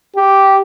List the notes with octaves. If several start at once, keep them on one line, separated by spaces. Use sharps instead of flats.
G4